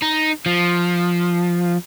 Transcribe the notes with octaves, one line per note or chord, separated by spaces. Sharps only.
D#4
F3